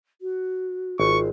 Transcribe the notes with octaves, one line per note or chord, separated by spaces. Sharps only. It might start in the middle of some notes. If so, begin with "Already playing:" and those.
F#4
G#1 F4 C#6